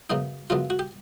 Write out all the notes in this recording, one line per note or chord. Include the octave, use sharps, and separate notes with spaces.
F#2 C#3 F#3 B3 D#4
F#2 C#3 F#3 B3 F4
F#4
G4